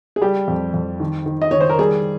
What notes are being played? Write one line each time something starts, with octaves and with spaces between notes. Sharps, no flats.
G#4
G3 G4
F2
F2
D#3
D#3
D#5
D#3 C#5
C5
A#4
G3 G#4